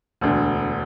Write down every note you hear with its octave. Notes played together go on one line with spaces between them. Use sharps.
E1 D2 D3